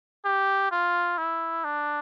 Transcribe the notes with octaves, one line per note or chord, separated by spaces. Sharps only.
G4
F4
E4
D4